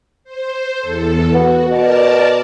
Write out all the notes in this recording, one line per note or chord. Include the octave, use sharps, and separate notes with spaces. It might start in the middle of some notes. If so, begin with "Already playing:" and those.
C5
E2 A4
B3 F#4
B2 A#4 D5 A5